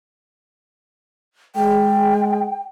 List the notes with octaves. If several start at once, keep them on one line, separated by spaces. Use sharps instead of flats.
G#3 G#4 G5